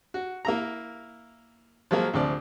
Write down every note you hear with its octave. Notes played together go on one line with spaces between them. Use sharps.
F#4
A#3 E4 A#5
F3 F#3 G#3 A#3
D2 C3 F3 D5